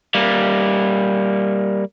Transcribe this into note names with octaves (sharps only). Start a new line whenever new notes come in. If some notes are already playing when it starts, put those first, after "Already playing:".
G3 A#3